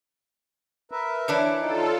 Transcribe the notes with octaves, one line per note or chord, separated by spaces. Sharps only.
A#4 B4 E5
E3 D4 E4 C#5 D5 A5
D#4 F4 A4